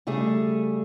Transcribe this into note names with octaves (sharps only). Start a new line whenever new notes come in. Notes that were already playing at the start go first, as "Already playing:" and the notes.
C#3 G3 A3 G#4